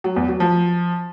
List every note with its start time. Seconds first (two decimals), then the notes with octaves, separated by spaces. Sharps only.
0.04 F#3
0.16 E2
0.28 F#3
0.40 F3